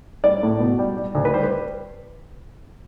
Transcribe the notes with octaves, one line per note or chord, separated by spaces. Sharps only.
G3 D5
A2
B2
G3
G3
D2
B4
G3 C5
B4